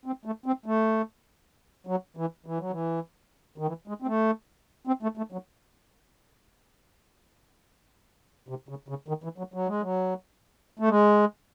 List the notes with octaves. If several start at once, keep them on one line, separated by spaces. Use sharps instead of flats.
C4
A3
C4
A3
F#3
E3
E3
F#3
E3
D#3
E3
G#3
C4
A3
C4
A3
A3
F#3
C3
C#3
C#3
D#3
E3
F#3
F#3
G#3
F#3
A3
G#3